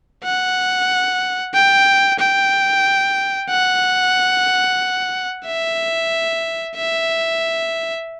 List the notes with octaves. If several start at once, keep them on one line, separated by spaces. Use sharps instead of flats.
F#5
G5
G5
F#5
E5
E5